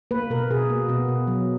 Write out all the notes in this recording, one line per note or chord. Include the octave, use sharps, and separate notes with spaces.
A#3 B4
B2 A#4
B2 G#4
A#3
B2 B3
B2
F#3